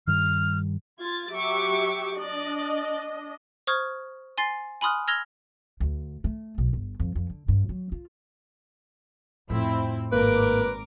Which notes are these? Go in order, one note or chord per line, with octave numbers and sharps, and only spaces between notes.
G2 D#3 G3 F6
F4 G#6 A6
F#3 G4 E5 C#6 D6
D4 D5 D#5
C5 C#6 D#6 F6 G#6
G#5 C6 A6 C7
G#5 B5 C6 D#6 F6 F#6
E6 F6 G#6 A#6 F7 G7
D2
A3
B1
G1
F2
F2
D3
G2
F#3
F4
F2 A2 C4 E4
G#1 A#3 A#4 B4 D6